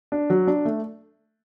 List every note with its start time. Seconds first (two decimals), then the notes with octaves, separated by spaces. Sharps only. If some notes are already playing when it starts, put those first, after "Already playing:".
0.12 D4
0.30 F#3
0.47 D4
0.65 A3